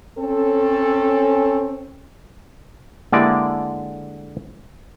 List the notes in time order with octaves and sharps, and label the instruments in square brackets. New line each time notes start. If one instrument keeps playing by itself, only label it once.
[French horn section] C4 C#4 A4
[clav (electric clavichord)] D3 G#3 D5 [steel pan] A#3 E4 G4